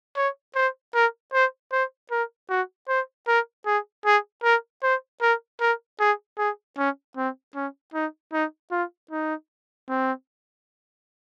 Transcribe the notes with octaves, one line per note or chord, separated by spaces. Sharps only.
C#5
C5
A#4
C5
C5
A#4
F#4
C5
A#4
G#4
G#4
A#4
C5
A#4
A#4
G#4
G#4
C#4
C4
C#4
D#4
D#4
F4
D#4
C4